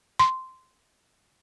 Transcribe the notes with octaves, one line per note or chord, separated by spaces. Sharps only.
C6